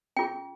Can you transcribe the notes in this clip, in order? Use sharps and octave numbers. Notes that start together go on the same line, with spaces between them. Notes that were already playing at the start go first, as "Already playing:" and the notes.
C#4 F4 G#4 G5